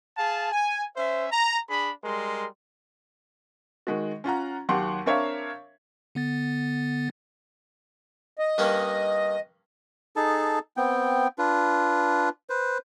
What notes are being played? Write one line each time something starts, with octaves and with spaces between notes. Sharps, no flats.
G#4 F5 A5
G#5
C#4 C5 E5
A#5
D4 G#4 B5
G3 G#3 A#4 C6
D#3 G#3 F#4
C#4 F4 F#5 A#5
D#2 F#3 G4 F#5 C6 C#6
C4 D4 A#4 C#5 E5 F5
D3 B3 A6
D#5
G2 A#3 C#4
D#4 G#4 A4 A5
B3 C4 G5
D4 F4 B4
B4 C5